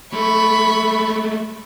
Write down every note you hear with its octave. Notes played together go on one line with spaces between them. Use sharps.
G#3 A3 B5 C#6